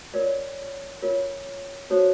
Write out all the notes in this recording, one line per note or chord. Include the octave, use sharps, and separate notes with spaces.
F4 A#4 C#5 D5
F4 A#4 C#5
D#4 F#4 A4 C5 C#5